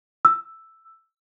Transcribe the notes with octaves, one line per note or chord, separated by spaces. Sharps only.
E6